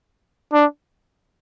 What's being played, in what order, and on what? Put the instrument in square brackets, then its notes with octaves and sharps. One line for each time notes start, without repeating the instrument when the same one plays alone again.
[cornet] D4